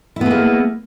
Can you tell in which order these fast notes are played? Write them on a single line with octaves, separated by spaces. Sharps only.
E4 B3 G#3 A#3